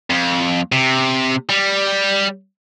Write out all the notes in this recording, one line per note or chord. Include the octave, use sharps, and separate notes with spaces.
F2
C3
G3